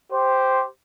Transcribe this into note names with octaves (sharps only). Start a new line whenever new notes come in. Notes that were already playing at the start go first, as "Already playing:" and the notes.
G4 C5